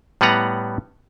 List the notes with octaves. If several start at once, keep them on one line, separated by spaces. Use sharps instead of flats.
A2 G3 B3 B4 F#5 A#5